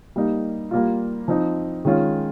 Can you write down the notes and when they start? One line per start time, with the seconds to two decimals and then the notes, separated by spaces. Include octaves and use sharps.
0.16 G3 A#3 D#4
0.71 G3 A#3 F4
1.28 F3 C4 D#4
1.85 D#3 G#3 C#4 F4